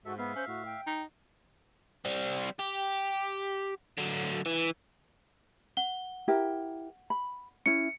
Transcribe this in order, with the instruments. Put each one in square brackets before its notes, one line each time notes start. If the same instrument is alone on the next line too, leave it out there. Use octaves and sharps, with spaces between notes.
[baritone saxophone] G#2 [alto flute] F#4 [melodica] A4 E5
[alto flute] B3 [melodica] E5 F5
[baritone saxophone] C#4 [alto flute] C5
[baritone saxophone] A2 [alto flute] F#4
[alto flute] G5
[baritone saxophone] D#4
[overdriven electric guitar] G3 C4
G4
D3 F#3
E3
[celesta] F#5 G7
[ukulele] E4 G4 A#4
B5
[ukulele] C#4 E4 [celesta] C#7